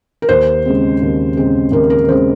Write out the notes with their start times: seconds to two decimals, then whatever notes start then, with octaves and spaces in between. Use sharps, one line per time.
0.22 A#4
0.29 D#2 C5
0.65 C#3 G#3 C4
1.01 D#2
1.37 C#3 G#3 C4
1.72 D#2 A#4
1.90 A#4
2.09 C#3 G#3 C4 C5